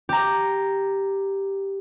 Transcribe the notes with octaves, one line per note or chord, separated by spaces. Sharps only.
G4 A#5